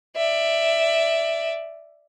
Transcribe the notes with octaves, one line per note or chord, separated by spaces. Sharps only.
D5 E5